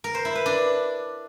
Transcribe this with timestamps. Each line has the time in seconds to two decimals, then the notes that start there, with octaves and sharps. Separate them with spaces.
0.04 A#4
0.15 C5
0.25 E4
0.35 B4
0.46 D4